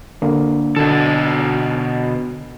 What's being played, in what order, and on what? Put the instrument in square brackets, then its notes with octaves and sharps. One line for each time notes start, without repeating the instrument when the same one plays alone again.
[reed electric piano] D3 A#3 D4
[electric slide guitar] B2 A4 [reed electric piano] D3 F#4